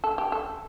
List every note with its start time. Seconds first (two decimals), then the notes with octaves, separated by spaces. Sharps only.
0.04 A4
0.18 G4
0.32 A4